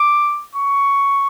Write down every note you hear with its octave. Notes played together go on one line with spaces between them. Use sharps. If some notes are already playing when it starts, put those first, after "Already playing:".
Already playing: D6
C#6